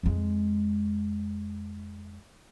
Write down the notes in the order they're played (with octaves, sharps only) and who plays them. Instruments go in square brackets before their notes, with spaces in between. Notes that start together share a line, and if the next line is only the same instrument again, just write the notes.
[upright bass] F2 G#3